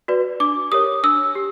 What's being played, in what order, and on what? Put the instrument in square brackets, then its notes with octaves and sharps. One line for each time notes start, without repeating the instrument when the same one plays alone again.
[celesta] F#4 B4 D5
D4 D6
G4 A#4 C#5 D#6
D4 E6
G4